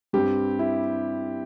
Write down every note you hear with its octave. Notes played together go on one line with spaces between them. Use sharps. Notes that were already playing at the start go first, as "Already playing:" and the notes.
G2 G3 C4 G4
E4